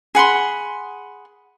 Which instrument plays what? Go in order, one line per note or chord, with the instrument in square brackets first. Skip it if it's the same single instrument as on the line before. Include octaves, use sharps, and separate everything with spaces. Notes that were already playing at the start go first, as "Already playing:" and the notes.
[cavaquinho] G#4 F#5 B5 C6